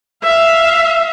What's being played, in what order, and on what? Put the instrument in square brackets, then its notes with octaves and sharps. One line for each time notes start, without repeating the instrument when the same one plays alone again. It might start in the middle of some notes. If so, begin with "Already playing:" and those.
[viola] E5 F5